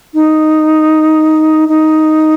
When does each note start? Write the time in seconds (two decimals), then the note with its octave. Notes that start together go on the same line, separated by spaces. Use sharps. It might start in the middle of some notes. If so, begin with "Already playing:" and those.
0.14 D#4
1.69 D#4